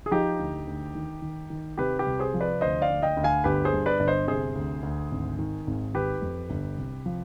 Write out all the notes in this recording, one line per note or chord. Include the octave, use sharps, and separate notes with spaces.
G#4
F3 D#4 G4
D2
D2
D#3
D#3
D#3
C3 G4 B4
G4 B4
C2
G#4 C5
F3
B4 D5
D2 C5 D#5
D5 F5
D2
D#5 G5
D2
F5 G#5
G1 G4 B4
G#4 C5
G2
B4 D5
G1 D5
C5 D#5
C3 G#4 C5
D2
D2
G#1
D#3
G#1
D#3 G4 B4
F2
G1
C2
F3